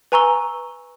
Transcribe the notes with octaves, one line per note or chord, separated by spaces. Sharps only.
B4 G#5 A#5 C#6 E6 G7